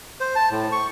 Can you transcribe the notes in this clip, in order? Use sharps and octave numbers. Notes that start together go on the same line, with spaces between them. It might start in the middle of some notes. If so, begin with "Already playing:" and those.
C5
A5
A2
C#6